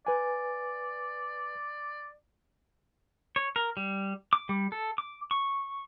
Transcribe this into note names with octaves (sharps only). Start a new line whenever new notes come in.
B4 D5 G#5
C#5
A#4
G3
D6
G3
A4
D6
C#6